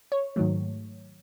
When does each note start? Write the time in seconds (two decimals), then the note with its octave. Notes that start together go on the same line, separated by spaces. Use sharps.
0.12 C#5
0.36 G#2 D#3 F#3 A3